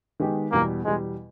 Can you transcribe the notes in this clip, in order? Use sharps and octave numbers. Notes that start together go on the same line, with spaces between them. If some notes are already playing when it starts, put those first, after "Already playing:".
D#3 G#3 B3 G4
E2 B2 G3 A#3
E2 B2 G3 G#3